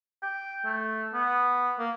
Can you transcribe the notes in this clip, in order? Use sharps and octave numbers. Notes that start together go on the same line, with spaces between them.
G5
A3
B3
A#3